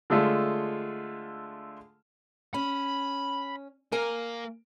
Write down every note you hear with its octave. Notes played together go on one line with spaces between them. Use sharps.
D3 G#3 A3 F4
C#4 B5
A#3 A#4 G#5